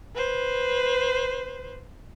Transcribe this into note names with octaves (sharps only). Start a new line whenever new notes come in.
B4 C5